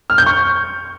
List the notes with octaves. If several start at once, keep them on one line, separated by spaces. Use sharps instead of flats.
F6
G6
C#6